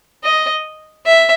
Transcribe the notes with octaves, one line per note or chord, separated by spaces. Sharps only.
D#5
E5